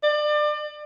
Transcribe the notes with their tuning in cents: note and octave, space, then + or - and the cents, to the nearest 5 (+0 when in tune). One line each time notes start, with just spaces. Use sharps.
D5 +30